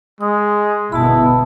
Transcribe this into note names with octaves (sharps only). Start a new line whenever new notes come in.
G#3 D#6
G1 B2 B3 E4 A5 B5